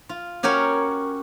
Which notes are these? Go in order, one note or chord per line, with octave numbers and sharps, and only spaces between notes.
F4
C#4 F#4 G4 A#4 C#5